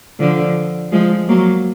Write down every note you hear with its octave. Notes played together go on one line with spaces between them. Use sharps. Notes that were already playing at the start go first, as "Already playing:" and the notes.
D3 F3
F3 G#3
F#3 A#3